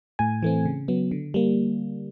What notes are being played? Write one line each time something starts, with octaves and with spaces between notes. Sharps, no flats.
A2 G#5
E3 A3 C4
C#3
F#3 B3
D3
G3 A#3